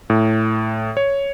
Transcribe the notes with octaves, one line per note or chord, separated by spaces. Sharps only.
A2
C#5